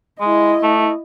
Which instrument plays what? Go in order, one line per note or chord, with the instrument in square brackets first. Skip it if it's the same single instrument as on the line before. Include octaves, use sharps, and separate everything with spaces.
[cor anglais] G#3 [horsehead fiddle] E4 D#5
[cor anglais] A3